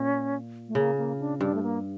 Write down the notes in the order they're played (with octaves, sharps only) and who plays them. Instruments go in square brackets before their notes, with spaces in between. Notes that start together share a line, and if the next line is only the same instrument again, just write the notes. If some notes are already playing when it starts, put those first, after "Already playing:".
Already playing: [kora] A#2 [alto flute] C#4
[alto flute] A3
[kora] C#3 [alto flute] A#3
[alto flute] A#3
D4
[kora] G2 [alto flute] D4
[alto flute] A3
A#3